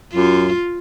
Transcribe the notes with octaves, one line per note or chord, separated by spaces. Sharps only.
F#2 F4